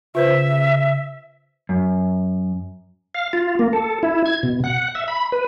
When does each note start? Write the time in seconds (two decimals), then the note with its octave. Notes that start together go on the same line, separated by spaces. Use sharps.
0.15 C#3 F4 B4 C5 E5
1.69 F#2
3.15 F5
3.33 F4
3.59 A#3
3.73 A4
4.03 E4
4.26 G#6
4.43 B2
4.64 F#5
4.95 E5
5.08 B5
5.32 B4